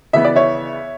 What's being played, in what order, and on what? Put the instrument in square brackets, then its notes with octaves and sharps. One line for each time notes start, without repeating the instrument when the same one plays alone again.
[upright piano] C#3 E3 B3 E5
D5
C#5 E5